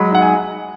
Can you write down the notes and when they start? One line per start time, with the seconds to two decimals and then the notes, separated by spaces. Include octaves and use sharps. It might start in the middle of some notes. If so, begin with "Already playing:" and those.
Already playing: F#3 G#3 B5
0.11 D#4 F#5
0.22 G#5